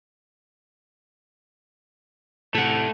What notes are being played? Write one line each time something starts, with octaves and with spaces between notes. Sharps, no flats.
A2 C3 A3 F#5